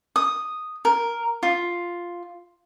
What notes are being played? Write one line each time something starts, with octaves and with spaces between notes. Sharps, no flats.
D#6
A#4
F4